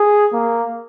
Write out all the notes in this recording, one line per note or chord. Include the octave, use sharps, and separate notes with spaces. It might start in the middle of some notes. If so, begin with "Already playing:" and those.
Already playing: G#4
A#3